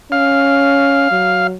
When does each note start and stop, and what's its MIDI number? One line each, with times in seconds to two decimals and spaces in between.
0.12 1.07 61
0.12 1.47 77
1.11 1.57 54